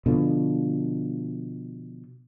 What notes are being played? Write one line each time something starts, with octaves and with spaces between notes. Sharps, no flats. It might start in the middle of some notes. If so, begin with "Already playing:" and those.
B2 D3 F3